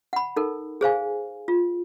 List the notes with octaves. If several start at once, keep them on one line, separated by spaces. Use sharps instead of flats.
F#5 B5
D#4 A4 A#4
G#4 C5 F5 G#5
F4